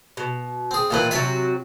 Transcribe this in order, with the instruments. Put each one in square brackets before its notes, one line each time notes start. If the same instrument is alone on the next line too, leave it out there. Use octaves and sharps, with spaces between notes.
[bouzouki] B2
[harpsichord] C4 G#4
[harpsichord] A#2 E3 C4 [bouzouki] F4 A4 B4
[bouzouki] C3 F#3 F#4 [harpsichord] E5 G#5 A5